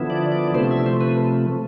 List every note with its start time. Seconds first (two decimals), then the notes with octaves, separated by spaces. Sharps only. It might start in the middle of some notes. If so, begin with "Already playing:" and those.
Already playing: D3 F3 B3 E4
0.10 D5
0.32 D5
0.55 C3 F3 A3 C5
0.71 E5
0.86 C5
1.01 B4